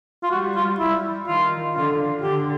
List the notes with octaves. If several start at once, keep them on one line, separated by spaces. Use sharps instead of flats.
F4
G3 F#4
F4
G3 E4
D#3 F4
D3 F4
D3 G4